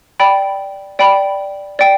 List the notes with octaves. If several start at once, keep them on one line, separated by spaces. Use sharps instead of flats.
D5 G5 B5
D5 G5 B5
D5 G5